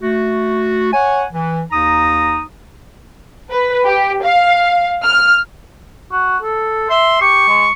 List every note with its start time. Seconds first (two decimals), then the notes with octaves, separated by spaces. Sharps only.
0.01 A3 F#4
0.93 C#5 F#5 G#5
1.32 E3
1.72 D#2 D#4 A#5 D#6
3.51 B4
3.86 G4
4.23 F5
5.06 F6
6.12 F#4
6.42 A4
6.90 E5 C6
7.21 G4 C#6
7.48 G#3